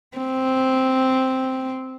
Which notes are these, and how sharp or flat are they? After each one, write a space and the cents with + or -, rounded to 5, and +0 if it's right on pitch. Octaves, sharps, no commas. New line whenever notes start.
C4 +0